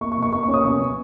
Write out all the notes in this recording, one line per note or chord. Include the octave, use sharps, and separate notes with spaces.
A#3 C#6
C#6
B2
C#6
A#3 C#6
C#6
C#4
D#6
B2 C#6
B2